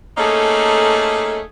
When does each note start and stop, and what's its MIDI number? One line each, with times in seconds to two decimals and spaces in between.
0.18 1.39 57
0.18 1.39 58
0.18 1.39 61
0.18 1.39 63
0.18 1.39 68
0.18 1.39 69